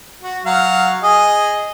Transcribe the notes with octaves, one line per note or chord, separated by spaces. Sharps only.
F#4
F#3 F5 F#5
G#4 D#5